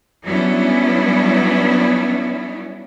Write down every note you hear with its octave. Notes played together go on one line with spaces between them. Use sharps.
F#3 G3 B3 C#4 D4 E4